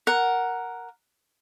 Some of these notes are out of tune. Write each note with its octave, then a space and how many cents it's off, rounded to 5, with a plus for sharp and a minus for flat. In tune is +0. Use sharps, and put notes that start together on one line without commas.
A#4 +0 F#5 +0